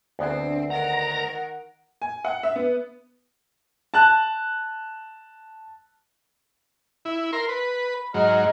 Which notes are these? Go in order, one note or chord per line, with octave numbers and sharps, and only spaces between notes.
D2 B3 C4 D4 G#4
D#3 A#4 F#5 A#5
G#5
F#5
E5
B3
A5 F#6
E4
A#4 C6
B4
B5
G#2 F#3 D#5 A#5 F6